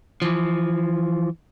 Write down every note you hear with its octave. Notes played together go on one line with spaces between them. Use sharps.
E3 F3